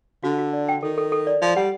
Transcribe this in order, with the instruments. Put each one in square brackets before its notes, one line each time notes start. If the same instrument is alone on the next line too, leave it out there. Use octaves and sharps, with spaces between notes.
[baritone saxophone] D3 [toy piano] F#4
[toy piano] F#4
D5
G5
[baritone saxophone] D#3 [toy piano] A4
[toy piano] A4
A4
D5
[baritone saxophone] F3 [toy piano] D5
[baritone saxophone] G3 [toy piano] F#5